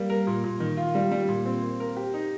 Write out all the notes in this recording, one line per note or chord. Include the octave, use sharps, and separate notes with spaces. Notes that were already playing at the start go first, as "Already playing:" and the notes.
Already playing: G3 A#3
A#4
A#2
A#2
D#3
F4
G3
G3
A#2
C4
A#3
A#4
G4
D#4